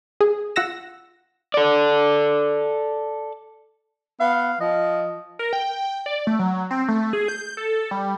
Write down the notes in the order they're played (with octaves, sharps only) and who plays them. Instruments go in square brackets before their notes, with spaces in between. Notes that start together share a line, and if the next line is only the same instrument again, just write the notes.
[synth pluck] G#4
F4 F#5 E6 A#6 E7
[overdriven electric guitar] A4 D5
[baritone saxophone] B3 [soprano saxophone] F5
[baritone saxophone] F3 [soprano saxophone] D#5
[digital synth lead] A#4
G5
D5
A3
F#3
C4
A3
G#4
G6
A4
G3